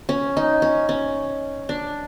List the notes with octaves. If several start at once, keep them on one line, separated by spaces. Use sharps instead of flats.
C#4
D#4
C#4
C#4
D4